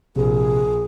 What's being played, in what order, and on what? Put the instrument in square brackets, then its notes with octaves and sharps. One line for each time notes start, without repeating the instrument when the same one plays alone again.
[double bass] A#1 [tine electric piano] C3 [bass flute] G#4